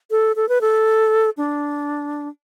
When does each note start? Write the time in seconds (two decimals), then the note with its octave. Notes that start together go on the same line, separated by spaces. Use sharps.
0.11 A4
0.36 A4
0.49 B4
0.61 A4
1.37 D4